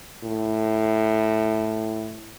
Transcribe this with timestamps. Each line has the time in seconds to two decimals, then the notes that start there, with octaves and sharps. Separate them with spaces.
0.24 A2